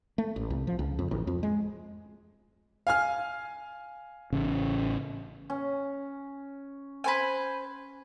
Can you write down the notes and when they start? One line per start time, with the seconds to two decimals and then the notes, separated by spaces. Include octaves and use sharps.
0.18 A3
0.36 A1
0.50 C2
0.67 F3
0.79 C#2
0.99 F2
1.11 A1
1.27 F2
1.43 G#3
2.87 F5 G#5 F6
4.32 A1 C#3
5.50 C#4
7.04 B4 C5 G#5